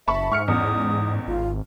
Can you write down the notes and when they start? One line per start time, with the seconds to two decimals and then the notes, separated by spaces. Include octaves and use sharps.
0.08 F#1 E5 A5 B5 C#6
0.32 G#2 C#6 F6 C#7
0.48 A1 E2 D#6
1.28 G#1 F4